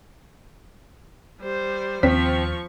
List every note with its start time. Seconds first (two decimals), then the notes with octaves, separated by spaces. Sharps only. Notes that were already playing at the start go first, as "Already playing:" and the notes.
1.41 G3 C5
2.03 D#2 F3 C4 C#6 B6